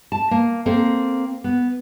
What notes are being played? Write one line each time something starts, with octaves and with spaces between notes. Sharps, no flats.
A5
A#3
A#3 C4 A4
B3